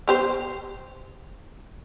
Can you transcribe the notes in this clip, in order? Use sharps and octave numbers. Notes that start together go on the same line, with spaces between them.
B3 G4 C5